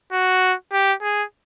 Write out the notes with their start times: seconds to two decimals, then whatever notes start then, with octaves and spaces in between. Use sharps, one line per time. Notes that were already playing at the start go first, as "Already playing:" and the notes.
0.12 F#4
0.72 G4
1.02 G#4